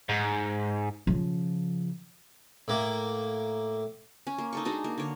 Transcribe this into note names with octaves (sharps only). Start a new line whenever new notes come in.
G#2
C#3 F3
A2 A#3
C#4
A#3
D#4 A4 C#6
G#3 D4 D#4 F#4
A#3
D3 C#5